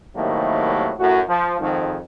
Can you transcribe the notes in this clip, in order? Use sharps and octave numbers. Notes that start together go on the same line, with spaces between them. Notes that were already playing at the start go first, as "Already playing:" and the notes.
A2 C3 D#3 F#3 G3 A#3
F#2 A2 F#4
F3
F2 G#2 D#3